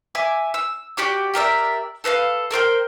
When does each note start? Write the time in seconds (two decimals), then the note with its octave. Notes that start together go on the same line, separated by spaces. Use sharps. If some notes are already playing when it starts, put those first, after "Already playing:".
0.15 E5 G#5 D6
0.54 E6
0.97 F#4 G4 D5 D6
1.34 G4 A#4 D5 E5
2.04 A4 B4 D#5 F5
2.51 A4 A#4 C5 G5